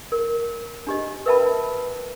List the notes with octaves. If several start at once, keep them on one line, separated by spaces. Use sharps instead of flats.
A#4
D4 G4 D#5
A#4 B4 E5 G5 A5 B5